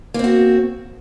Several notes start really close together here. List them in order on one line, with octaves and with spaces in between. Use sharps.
A#3 C4 F#4